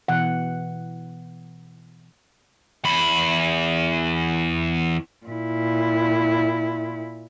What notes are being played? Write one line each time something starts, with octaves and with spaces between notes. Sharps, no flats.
B2 E3 F#5
E2 B5
A#2 E4